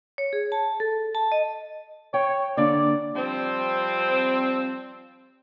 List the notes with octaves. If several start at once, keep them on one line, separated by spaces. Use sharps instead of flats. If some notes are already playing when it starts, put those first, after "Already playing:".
C#5
G#4
A5
A4
A5
D#5
C#5 G5
D3 A#3 D4 D5
F3 G3 C4